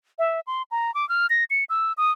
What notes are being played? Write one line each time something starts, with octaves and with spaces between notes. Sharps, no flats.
E5
C6
A#5
D6
F6
A#6
C#7
E6
D#6